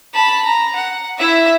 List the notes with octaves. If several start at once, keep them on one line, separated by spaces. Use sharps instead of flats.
A5 B5
A#5
F#5
E4 E5